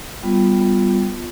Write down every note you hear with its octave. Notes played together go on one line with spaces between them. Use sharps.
G3 B3 F4